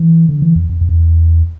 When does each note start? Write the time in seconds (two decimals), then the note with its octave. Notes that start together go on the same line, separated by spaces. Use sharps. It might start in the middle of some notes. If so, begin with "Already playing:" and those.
Already playing: E3
0.29 D3
0.42 E3
0.56 F2
0.69 F2
0.81 F2
0.89 E2